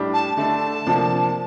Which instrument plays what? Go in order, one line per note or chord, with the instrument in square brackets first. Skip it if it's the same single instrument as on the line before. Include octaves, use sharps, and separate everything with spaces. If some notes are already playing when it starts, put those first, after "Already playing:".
Already playing: [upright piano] A2 G3 D4 G4
[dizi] A5
[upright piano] D3 A3 D4 [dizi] A5
[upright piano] C3 F3 A#3 D4 F4